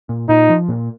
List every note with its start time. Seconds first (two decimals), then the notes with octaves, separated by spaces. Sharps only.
0.09 A#2
0.29 A#2 D#4
0.49 F3
0.69 A#2